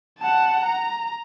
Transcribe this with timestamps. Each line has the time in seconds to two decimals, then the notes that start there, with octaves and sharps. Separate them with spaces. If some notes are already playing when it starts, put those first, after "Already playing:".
0.19 F#5 A5
0.64 A#5